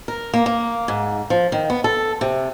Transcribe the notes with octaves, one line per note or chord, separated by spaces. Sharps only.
A#4
A#3
A#3
G#2
F3
D#3
B3
A4
C3